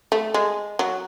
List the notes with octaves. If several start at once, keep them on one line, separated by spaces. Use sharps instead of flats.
A3
G#3
F#3